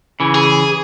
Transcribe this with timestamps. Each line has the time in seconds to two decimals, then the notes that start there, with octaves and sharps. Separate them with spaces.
0.20 C#3 E3
0.35 G#4